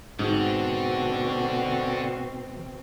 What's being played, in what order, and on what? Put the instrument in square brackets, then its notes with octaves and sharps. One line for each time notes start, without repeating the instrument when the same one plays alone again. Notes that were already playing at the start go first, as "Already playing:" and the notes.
[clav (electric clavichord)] G#2 [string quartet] B2 C4 [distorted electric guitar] D3 [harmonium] F#4